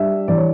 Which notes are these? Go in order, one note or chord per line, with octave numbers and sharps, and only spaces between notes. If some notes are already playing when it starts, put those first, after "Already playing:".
Already playing: G3 D4 E5
E3 D5
C#5